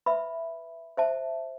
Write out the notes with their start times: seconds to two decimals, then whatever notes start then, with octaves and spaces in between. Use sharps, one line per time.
0.06 B4 E5 B5
0.97 C5 E5 A5